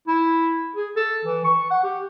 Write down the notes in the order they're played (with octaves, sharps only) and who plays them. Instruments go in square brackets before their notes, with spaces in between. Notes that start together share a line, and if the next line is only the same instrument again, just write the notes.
[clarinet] E4
G#4
A4
E3
C#6
F#5
G4